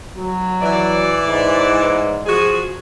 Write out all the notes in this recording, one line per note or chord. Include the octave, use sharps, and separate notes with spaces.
F#3
E3 D5
G#2
F3 F#4 G#4